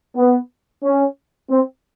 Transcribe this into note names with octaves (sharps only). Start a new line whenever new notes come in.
B3
C#4
C4